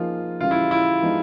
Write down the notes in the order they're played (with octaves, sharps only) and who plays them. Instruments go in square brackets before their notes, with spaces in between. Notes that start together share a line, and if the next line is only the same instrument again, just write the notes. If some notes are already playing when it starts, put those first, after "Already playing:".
Already playing: [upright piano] F3 A#3 D#4 G#4 [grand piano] F4
[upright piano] C#3 E3 G3 [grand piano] F4
[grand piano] E4
E4
[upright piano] F3 G#3 B3 D#4 G4